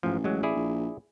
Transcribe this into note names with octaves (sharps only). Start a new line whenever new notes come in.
A1 G#2 F3
F#3 G#3
E4 G#4 D5
A#1